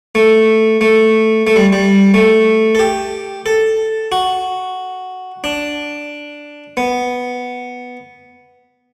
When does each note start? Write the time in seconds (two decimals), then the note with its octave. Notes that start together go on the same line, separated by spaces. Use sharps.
0.15 A3
0.81 A3
1.47 A3
1.56 G3
1.73 G3
2.14 A3
2.75 A4
2.79 G4
3.46 A4
4.12 F#4
5.44 D4
6.77 B3